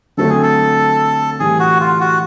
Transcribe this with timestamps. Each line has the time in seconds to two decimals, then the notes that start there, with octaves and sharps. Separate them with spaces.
0.17 D3 F#3 A3 C4 A4
0.29 G#4
0.43 A4
1.40 A2 E3 G3 G#4
1.60 F#4
1.80 F4
2.00 F#4